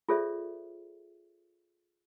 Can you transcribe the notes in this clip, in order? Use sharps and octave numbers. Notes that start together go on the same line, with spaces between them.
F4 G#4 A4 C5 D5 E5